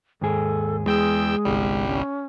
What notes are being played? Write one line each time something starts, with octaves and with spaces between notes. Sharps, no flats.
D#2 G#2 G#4 A4
E2 G#3 G#4 G5 E6
G1 C2 G3
C#4